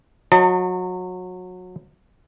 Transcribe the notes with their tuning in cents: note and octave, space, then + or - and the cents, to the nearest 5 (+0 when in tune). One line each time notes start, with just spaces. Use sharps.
F#3 -25 D#5 +0 A5 +45